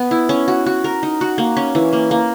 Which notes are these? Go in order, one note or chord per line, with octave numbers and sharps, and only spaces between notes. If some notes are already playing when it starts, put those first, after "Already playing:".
Already playing: B3 B4
E4
C#4
F#4
F#4
A#4
D#4
F#4
A#3
C#4
E3
A#3
A#3